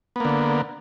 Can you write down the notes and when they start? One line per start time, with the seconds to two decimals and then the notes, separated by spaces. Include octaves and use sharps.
0.16 B3
0.20 A#3
0.25 D3